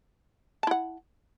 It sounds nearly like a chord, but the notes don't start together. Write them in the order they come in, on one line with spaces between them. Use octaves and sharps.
A5 E4 F#5